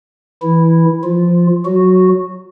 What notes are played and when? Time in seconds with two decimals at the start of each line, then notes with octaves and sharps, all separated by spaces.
0.42 E3 E4
1.04 F3 F4
1.65 F#3 F#4